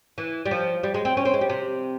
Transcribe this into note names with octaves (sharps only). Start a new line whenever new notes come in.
E3
G3
F3
G3
G#3
C4
C#4
C4
G#3
G3
C3